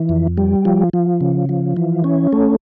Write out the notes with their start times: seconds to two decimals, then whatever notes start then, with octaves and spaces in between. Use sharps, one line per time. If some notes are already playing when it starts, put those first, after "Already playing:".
Already playing: E3
0.09 F2
0.37 G3
0.65 F3
0.93 F3
1.21 C#3
1.49 F3
1.77 E3
2.04 C#4
2.33 A3